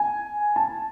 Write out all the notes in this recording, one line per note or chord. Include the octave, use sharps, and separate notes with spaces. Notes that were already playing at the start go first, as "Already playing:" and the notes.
Already playing: G#5
A5